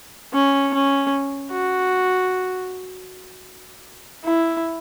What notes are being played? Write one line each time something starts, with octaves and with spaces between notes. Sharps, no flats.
C#4
C#4
F#4
E4